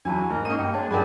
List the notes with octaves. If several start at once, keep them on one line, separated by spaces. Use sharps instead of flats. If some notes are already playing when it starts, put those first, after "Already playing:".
E2 F#3 D4 F4 G#5 A5
G#2 A#4
A#3 C#4 D#4 D#5 D#7
G2 G5
G#3 D4 C#5 A5
G2 F#3 G4 G#4 A#4 D5 G#5 B5